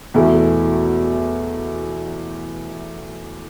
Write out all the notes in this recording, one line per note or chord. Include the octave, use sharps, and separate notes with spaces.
E2 B2 A3 E4